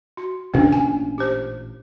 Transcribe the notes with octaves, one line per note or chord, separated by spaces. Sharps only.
F#4
A1 A#2 A#3 C#4 D4
G#5
G4 C5